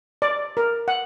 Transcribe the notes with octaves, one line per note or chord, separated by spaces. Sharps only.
D5
A#4
F#5